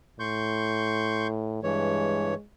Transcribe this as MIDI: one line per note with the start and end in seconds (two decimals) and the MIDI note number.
0.20 1.62 45
0.20 1.27 84
0.20 1.27 85
0.20 1.27 91
1.63 2.34 43
1.63 2.34 52
1.63 2.43 56
1.63 2.34 73